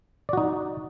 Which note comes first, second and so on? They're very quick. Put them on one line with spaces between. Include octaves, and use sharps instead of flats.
D5 F#4 D#4